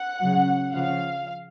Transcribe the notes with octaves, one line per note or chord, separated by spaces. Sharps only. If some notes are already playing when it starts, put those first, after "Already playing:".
Already playing: F#5
C#3 F#3
C#3 F3 F5